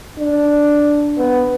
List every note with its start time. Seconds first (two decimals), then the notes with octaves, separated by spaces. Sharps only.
0.19 D4
1.18 B3